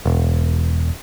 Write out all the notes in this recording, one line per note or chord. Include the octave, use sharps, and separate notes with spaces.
E1